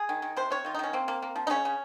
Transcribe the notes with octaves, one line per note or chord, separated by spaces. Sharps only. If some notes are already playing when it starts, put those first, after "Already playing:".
Already playing: G#4
D#3
D#3
C3 C5
C3 C#5
D#3 F4
D#4
D#3 C#4
A#3 C4
A#3
A#3
F3
D#4
C#3 C#4
C#3